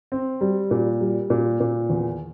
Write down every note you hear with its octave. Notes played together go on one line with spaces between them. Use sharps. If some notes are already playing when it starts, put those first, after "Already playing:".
C4
G3
A#2
G3
A#2
A#2
E2